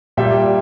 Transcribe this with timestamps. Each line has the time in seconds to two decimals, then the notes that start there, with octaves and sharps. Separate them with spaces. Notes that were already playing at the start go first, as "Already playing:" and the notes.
0.17 A#2 G3 E5 G5